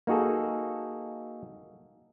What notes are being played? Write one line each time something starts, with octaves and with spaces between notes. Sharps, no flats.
A#3 D#4 F#4 G#4 A4